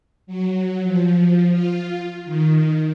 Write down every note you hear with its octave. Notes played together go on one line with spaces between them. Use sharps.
F#3
F3
F4
D#3